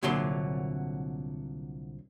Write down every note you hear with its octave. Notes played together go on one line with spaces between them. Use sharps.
C2 A#2 D3 F#3 C6